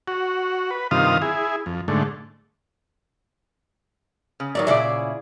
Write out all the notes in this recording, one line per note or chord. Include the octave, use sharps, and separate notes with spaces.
F#4
B4
G2 C3 D#3 F4 F5 D#6
E4 G#4
F2
G#2 D3 A3
C#3
D#3 F#3 A#3 D5
A#2 C#3 E4 G#4 A4 D5